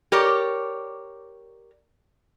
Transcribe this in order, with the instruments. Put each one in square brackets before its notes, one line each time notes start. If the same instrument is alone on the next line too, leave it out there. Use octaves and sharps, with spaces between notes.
[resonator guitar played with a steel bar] G4 A#4 C#5 D5